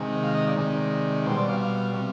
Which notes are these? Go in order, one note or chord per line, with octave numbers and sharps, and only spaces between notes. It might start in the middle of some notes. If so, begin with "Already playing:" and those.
Already playing: C3 D#3 G#3
F5
D#5
D5
C3 D#3 G#3
B2 G3 C5
D5
F5
F5
C3 G3